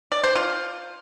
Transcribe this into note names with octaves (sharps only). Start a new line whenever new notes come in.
D5
C5
F4